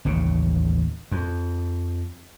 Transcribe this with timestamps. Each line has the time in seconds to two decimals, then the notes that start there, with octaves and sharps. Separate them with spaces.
0.05 A1 D#2 C#3
1.11 F2